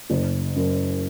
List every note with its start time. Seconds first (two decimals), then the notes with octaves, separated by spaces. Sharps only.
0.10 F#1
0.56 F#2